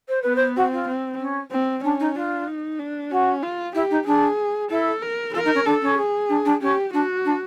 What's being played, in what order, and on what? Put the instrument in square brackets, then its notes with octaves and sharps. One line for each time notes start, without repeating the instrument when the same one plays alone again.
[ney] C5
[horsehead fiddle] B3 [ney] B4
[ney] C5
[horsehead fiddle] C4 [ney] F#4
[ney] F4
[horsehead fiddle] C4
[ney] C#4
[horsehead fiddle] C4
[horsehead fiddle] C#4 [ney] D4
[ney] D#4
[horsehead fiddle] D4 [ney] F4
[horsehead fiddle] D#4
D4
[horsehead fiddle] C#4 [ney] F#4
[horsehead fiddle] F4
[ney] E4 [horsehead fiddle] G4
[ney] D#4
[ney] D4 [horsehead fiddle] G#4
[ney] E4 [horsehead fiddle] A4
[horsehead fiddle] A#4
[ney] F4 [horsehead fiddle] A#4
[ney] D#4
C#4
[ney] D4 [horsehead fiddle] A4
[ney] C#4
[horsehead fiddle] G#4
[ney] D4
D4
[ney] C#4 [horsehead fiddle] G4
[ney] D4 [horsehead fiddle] F#4
[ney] D4